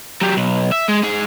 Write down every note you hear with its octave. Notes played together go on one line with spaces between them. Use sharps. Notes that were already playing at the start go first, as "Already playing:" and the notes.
F#3 G4
B1
E5
G#3
G#2 G#4